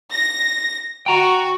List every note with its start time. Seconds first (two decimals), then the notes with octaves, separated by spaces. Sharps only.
0.12 A#6
1.06 F#4 G5 A#5